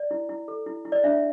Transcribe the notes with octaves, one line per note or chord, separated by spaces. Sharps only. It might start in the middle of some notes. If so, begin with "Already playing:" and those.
Already playing: D5
E4
E4
A4
E4
E4
D5
D4 E5